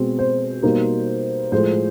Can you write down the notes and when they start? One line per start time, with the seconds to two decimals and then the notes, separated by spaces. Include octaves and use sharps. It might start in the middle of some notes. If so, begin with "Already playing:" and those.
Already playing: B2 G#3 C4
0.19 C5
0.63 B2 G3 A#3 D#4
1.52 A2 F3 G#3 C5